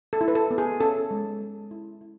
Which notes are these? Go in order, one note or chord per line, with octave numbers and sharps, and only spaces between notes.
A4
E4
B4
A4
B3
G#4
C#4 A4
G#3
G#3
E4
E4